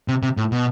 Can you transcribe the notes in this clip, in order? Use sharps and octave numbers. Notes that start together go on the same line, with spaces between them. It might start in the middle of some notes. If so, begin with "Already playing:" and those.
C3
C3
A2
B2